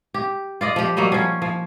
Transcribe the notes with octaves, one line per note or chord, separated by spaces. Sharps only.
G4
F4 D5 D#5
F3 G4
F#3 G3 A#3 D#5
F3 C#4
F3